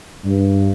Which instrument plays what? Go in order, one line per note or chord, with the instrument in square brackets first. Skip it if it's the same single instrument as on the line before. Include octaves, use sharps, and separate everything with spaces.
[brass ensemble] G2